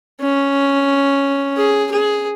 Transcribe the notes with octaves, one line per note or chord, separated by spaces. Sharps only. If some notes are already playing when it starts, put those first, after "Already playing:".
C#4
G#4
G#4